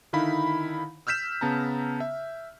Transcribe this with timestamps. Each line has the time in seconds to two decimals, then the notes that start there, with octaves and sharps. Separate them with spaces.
0.13 D3 D#3 D#4 E4 F5 B5
1.07 E6 F6 G6 B6 E7
1.41 C#3 B3 A5 A#5
2.00 E5